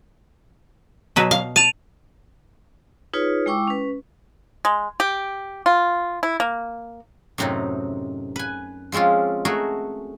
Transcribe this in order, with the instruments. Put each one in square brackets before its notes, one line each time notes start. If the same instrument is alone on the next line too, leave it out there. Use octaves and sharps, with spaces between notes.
[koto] B2 F#3 B4
F5
[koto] A5 [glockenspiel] D#7 F7
[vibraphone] D#4 F4 G#4 B4 C#5
G#3 E4 G5 C#6 D6 E6
C#4 B4
[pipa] G#3
G4
F4
E4
A#3
[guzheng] F#2 A2 C3 C4 D#4
B4 G#5
F3 G#3 C4 C#4 F4
A3 F#4 G#4 A#4